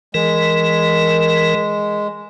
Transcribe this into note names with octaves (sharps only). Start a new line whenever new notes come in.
E3 G#3 A#4